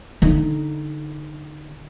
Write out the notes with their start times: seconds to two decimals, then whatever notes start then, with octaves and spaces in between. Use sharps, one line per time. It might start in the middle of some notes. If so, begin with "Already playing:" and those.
0.22 D3 D#4